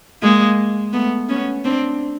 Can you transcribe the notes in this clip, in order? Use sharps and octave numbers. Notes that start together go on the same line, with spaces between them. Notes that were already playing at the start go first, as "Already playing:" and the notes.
G#3 A#3
A3 B3
B3 C#4
C4 D4